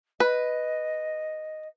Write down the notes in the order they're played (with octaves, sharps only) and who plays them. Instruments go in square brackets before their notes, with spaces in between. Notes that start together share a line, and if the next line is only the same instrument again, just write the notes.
[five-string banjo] B4 [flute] D#5